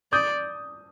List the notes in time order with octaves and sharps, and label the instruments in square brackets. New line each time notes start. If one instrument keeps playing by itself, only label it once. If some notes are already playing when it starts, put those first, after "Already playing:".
[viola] D5 [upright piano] D#6 G6